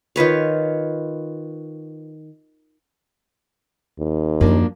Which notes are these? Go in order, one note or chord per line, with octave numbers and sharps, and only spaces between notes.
D#3 F4 B4 C#5
D#2
F#2 F3 F#3 A#3 D4